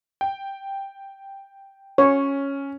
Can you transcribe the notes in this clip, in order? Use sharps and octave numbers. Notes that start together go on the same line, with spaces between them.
G5
C#4 C#5